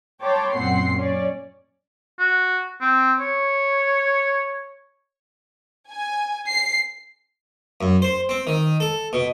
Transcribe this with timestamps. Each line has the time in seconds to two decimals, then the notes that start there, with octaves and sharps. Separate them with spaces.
0.22 C#5 G5 A5 B5 C6 D6
0.54 F#2 A#2 C4 F#5 C6 C7
0.96 C#4 C#5 D5
2.19 F#4
2.81 C4
3.20 C#5
5.91 G#5
6.48 C7
7.81 F#2
8.02 C5
8.29 C4
8.47 D#3
8.80 A4
9.13 B2